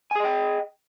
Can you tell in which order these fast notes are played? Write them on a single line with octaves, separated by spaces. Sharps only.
G#5 G#4 D#5 G5